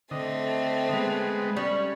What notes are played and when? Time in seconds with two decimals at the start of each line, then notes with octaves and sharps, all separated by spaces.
0.11 D3 A3 C4 D#5
0.93 G#3 B3
1.56 G3 C#4